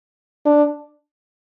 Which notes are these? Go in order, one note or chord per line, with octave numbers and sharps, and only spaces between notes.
D4